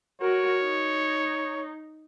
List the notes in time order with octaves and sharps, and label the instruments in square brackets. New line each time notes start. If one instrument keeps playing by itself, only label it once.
[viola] F#4 A#4 [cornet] C#5
[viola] D#4